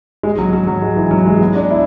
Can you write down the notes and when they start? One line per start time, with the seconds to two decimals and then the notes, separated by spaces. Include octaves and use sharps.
0.23 G#3
0.38 F#3
0.53 F#3
0.67 F#3
0.82 G#3
0.97 E3
1.11 F#3
1.26 G#3
1.41 B3
1.55 D4
1.70 E4